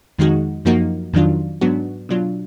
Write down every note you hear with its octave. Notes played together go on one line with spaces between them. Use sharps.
F2 D#3 G#3 D#4 F#4
F#2 F3 A#3 D#4 F#4
F2 D#3 F#3 D4 F4
G#2 F#3 B3 D4 F#4
B2 F#3 D4 F4